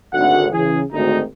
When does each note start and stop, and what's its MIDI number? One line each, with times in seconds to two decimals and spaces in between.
0.14 0.47 32
0.14 0.47 38
0.14 0.47 78
0.53 0.81 49
0.53 0.81 52
0.53 0.81 68
0.93 1.20 32
0.93 1.20 38
0.93 1.20 63